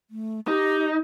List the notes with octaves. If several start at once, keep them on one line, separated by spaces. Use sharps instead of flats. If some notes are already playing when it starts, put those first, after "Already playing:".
A3
D#4 G4